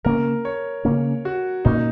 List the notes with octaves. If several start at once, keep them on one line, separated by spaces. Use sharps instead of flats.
C#3 A#3 C#4 A#4
C#5
C#3 A#3 C#4
F#4
A#2 A#3 C#4 D#4